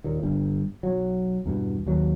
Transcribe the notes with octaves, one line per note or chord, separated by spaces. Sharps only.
D#2 A#2
G1 G2
B1 F#3
E2 G2 B2
D#2 F#3